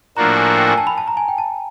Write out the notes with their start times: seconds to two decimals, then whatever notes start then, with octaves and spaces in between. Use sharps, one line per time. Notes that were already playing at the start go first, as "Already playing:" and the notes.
0.17 A2 F3 A#3 D4 F#4 A#5
0.36 G#5
0.57 G5
0.68 G#5
0.78 A5
0.87 B5
0.98 A5
1.08 A#5
1.17 G#5
1.28 G5
1.38 A5